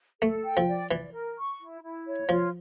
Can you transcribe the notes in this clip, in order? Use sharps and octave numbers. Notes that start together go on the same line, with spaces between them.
A3 A4
G5
F3
D5
E3 D5
A#4
C#6
E4
E4
C#5
F3 F4